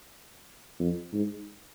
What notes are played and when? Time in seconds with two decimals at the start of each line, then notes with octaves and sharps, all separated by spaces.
0.79 F2
1.12 G#2